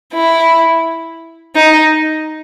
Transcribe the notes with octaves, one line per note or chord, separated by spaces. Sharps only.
E4
D#4